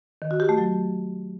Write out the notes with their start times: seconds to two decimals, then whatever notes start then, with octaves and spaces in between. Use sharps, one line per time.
0.22 D#3
0.31 F#4
0.40 G4
0.49 A3
0.58 F#3